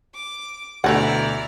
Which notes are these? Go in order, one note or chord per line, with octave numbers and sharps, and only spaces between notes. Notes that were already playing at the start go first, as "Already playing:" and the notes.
D6
D2 B2 A3 E4 F#4 D5 F#5 A#5